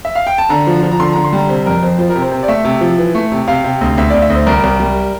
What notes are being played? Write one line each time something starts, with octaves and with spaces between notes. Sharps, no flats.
E5
F5
G5
A5
D3 A#5
F3
F3
A#5
D3 C6
D3 A#5
C6
G3 A#5
C3 C5
F2 A#4
F2 C5
F3 C5
A#4
C3
C5
C3
D5
A3 E5
C3
F3
E3
A3
C3
C3 F5
C3
D2
D2 E5
D2 D5
E5
D2
C5
C2 A#4
C2
G3